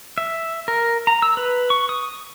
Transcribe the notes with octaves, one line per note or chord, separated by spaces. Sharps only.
E5
A#4
A#5
E6
B4
C#6
D#6